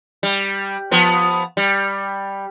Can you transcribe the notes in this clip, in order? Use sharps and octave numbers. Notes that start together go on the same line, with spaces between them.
G3
F3 B3
G3